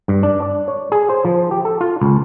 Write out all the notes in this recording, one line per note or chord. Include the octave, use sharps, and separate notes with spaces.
G2
D4
D5
C#5
G#4
C5
F3
G4
A4
F4
C#2